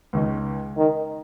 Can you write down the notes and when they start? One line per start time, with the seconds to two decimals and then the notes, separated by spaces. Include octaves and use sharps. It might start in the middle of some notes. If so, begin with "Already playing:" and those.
0.13 C#2 C#3 G#3 D#4
0.77 D#3